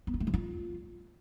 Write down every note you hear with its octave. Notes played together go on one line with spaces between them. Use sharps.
B3
F4
A3
F3
F4